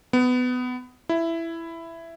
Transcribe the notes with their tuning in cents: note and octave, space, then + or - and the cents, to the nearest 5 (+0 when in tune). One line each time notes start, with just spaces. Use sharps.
B3 +20
E4 +10